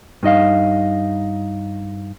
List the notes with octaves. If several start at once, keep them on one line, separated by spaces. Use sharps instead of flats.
G2 D#4 D#5 F5